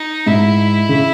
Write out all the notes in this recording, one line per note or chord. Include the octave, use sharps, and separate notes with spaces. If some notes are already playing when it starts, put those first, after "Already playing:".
Already playing: D#4
G#2 E4
C#3